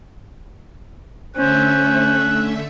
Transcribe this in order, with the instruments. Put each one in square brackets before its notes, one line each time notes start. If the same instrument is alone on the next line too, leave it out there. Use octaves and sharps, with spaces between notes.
[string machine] D3 A3 E5 [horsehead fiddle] C#4 [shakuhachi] C5 [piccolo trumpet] F#6